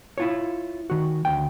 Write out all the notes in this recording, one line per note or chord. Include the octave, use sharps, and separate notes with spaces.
E4 F4 C#5
D#3 F#4
D2 G5